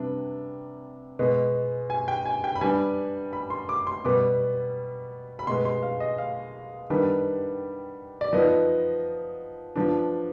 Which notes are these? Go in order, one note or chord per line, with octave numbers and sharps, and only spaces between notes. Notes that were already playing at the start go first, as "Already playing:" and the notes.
Already playing: C3 G3 B3 D4
B2 G#3 B3
G#5
G5
G#5
G5
B5
G3 B3 D4 G#5
B5
C6
D6
C6
B2 G3 B3 D6
B5
B2 G#3 B3 C6
C6
F5
D#5
F5
D#3 G3 B3 D4
D5
F3 B3 D#4 D#5
F3 B3 D4